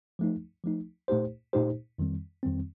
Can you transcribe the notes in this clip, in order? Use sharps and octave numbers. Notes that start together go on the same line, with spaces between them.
F3 A3 D#4
F3 A3 D#4
A#2 A3 D#4 G4 C5
A#2 A3 D#4 G4 C5
F2 D#3 G3 C4
F2 D#3 G3 C4